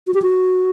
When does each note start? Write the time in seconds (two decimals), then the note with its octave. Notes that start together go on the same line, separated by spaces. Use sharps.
0.07 F#4
0.14 G4
0.22 F#4